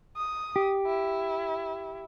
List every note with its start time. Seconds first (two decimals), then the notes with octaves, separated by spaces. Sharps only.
0.16 D#6
0.56 G4
0.87 E4